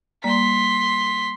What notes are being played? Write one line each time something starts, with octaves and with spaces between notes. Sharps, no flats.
G3 A#3 D5 C6 B6